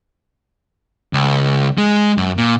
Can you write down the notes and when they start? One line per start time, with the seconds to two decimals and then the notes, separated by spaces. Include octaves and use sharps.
1.13 C#2
1.78 G#3
2.18 F#2
2.37 A#2